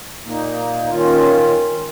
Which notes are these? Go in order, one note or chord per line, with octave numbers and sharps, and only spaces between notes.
A#2 A#3 D#4
D#3 C#4 F4